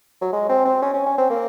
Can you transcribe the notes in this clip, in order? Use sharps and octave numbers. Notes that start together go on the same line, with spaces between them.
F#3
G#3
C4
C4
C#4
C#4
C#4
C4
A#3